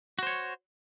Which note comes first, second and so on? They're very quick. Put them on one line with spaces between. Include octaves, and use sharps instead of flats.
F#4 C5 C#5